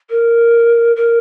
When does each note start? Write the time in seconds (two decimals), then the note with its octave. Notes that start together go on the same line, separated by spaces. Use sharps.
0.10 A#4
0.96 A#4